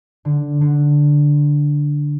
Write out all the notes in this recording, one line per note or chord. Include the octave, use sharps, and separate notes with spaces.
D3
D3